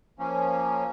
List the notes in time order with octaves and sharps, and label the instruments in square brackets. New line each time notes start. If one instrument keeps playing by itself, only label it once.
[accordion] F3 A#3 C#4